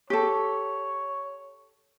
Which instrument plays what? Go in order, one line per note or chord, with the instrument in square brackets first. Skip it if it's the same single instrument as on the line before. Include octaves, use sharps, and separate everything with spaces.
[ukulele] G4 A4 [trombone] C#5